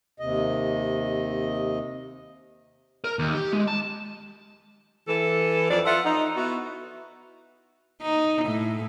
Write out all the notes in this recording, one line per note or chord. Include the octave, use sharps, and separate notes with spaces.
D#2 C3 D#5
A#4
D#2
G4
G#3
A5
E3 A4
F2 D5
F4 A4 E5 F#5
D#4
B3 E4 F#4
D#4
A2